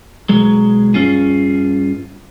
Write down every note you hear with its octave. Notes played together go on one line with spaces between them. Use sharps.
B1 F#3 G#3
G2 C#4 F4 G#4